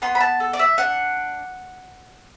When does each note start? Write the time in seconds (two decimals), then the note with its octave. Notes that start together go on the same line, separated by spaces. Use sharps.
0.02 B3 C6
0.15 B5
0.20 A5
0.40 A4
0.53 D5
0.59 E5
0.78 D4 F#5